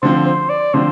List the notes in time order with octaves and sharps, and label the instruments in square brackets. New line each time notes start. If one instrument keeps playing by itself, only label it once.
[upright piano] D3 F3 C4 [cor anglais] C5
[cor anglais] C5
D5
[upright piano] D3 F3 C4 [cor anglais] C5